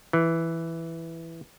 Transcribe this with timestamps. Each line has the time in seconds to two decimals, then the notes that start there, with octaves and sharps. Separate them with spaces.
0.13 E3